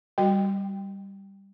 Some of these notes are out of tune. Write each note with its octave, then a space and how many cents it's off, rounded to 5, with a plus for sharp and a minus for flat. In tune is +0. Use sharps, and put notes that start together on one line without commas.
G3 +0 F#4 +0 G5 +0